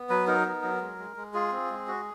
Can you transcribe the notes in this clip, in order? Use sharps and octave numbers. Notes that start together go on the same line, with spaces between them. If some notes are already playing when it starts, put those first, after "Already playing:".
Already playing: B3
F#3 B4
D#4 A#4
B3
F#3
G#3
G#3
G#3
F4 G#4
C4
G#3
F#4